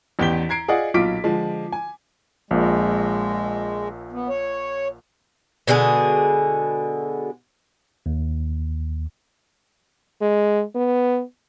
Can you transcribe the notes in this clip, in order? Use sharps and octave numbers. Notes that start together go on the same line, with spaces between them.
A1 E2 G4 G5 B6 G7
A#5 G#6 C7 D7
F4 G#4 D5 D#5 F#5
B1 A#2 F4 D6 B6 D7
D3 F3 G#3
G#5
A#1 A#2 G#3
B3
C#5
B2 D3 G#3 G#4
D#2
G#3
B3